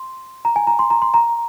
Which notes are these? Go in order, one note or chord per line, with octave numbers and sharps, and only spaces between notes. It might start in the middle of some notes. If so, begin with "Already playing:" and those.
Already playing: C6
A#5
G#5
A#5
C6
A#5
C6
A#5